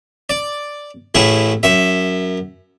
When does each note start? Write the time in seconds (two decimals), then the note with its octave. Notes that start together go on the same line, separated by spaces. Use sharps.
0.30 D5
1.15 A1 A2 E4 G#4
1.63 F#2 E5